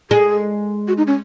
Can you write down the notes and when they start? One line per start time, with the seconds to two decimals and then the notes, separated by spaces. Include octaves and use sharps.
0.11 G#3 G#4
0.88 F#4
0.98 D#4
1.07 C#4